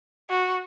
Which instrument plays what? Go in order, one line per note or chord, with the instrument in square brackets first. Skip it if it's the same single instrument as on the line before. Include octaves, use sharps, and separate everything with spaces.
[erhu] F#4